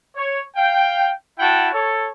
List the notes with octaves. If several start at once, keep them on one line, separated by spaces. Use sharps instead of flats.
C#5
F5 G5
E4 F#4 F#5 G5 A5
A4 C#5